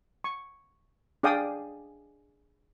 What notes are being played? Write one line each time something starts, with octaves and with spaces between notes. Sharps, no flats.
C#6
D4 G#4 D5 F5 G5 D#6